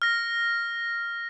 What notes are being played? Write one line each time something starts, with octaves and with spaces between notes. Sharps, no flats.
F6 A#6